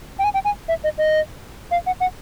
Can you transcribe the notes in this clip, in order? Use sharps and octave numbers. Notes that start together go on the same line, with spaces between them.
G5
G#5
G5
G#5
E5
D#5
D#5
F5
F#5
F#5